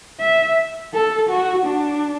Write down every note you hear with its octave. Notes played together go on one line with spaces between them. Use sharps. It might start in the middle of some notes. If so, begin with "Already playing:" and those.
E5
A4
F#4
D4